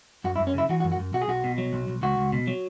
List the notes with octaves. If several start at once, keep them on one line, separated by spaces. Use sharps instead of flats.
F#2 F#4
E4
F#2
C#4
C#3 E4
E3 F#4
F#4
F#2
F#4
F#2
B1 F#4
G#4
B1 F#4
B2
F#3
B1
B1
C#2 F#4
C#2
B2
F#3